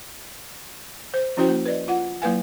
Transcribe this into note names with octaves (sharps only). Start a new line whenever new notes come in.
C5
F3 C#4 E4 F#4 C5 G5
A#3
B4 D5 D#5
F4 F#5
F#3 A#3 E4 B4 F5 G#5